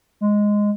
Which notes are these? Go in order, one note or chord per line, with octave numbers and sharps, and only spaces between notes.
G#3